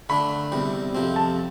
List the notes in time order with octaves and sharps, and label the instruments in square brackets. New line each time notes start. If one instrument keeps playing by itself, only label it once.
[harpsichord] D3 A3 D4 [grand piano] B5
[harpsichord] E2 C3 G3
F2 C3 F3 C4
[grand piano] A5